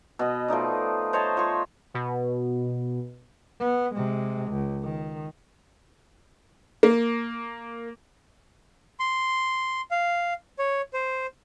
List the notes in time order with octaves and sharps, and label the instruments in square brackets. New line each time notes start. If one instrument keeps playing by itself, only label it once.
[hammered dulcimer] B2 D#5
F3 A3 D#4 D5
C5 C#5 D#5 A5
F3 C#5 C#6
[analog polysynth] B2
[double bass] B3
C3 G#3
C#2
D#3
[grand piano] A#3
[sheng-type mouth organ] C6
F5
C#5
C5